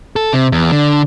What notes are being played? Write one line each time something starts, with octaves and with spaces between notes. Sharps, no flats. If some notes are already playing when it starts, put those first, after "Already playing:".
A4
C3
E2
D3